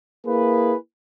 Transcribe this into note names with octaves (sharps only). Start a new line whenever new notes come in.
A#3 E4 G#4 B4